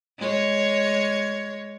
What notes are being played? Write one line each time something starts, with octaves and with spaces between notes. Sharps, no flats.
G#3 C#5